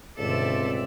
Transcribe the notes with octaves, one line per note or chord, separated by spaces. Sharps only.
C#2 G2 B2 D3 C4 A4 D5 E5